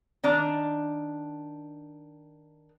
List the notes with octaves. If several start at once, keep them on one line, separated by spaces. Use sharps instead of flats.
D#3 D4 A#5